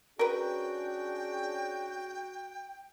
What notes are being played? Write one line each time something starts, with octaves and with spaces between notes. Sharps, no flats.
C#4 D4 F#4 G#4 A#4 B4 G5